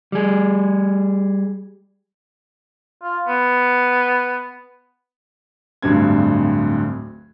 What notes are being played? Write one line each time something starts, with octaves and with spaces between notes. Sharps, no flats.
G3 G#4
F4
B3
D1 D2 G2 C4 G#6